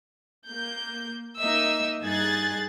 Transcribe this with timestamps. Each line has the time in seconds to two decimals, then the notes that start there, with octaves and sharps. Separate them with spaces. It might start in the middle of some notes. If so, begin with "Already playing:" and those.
0.48 A#3 G6
1.38 A#3 D#4 D#5 E5 E6
2.02 G2 D#4 G#4 F#6 G#6 A6